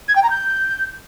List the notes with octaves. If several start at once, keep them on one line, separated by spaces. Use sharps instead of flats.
G#6
G5
A#5
G6